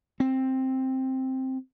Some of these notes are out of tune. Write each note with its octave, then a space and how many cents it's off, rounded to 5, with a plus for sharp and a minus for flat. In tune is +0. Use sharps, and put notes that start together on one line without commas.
C4 +5